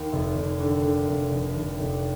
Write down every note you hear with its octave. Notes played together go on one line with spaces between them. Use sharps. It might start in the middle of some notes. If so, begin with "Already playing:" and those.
Already playing: D#2
F1
F1
D3
D3
F1
F1
F1
F1